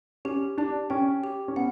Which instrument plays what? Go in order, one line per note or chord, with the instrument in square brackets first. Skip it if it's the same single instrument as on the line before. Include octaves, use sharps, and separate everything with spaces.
[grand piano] C#4 [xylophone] G4
[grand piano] D4 [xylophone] G4
[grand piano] C#4 [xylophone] G5
[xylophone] G4
[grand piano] C#4
[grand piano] B3 [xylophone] F#5